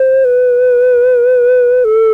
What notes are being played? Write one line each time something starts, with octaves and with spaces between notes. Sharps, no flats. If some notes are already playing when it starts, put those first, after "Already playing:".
Already playing: C5
B4
A4